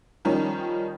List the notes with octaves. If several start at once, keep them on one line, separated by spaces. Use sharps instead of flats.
D#3 F3 G3 C#4 D#4